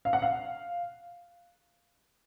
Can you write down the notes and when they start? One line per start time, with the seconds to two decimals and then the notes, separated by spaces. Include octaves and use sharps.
0.05 F5
0.13 F#5
0.22 F5